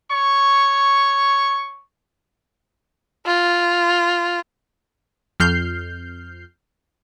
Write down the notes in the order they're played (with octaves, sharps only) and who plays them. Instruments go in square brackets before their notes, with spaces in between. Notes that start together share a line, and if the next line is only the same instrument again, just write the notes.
[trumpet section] C#5 C#6
[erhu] F4
[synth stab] F2 F6 G6 C7